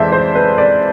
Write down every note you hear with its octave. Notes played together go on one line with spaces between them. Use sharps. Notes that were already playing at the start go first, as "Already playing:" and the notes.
Already playing: F2 E3 G#3 C5 D5 E5
C5
B4
D5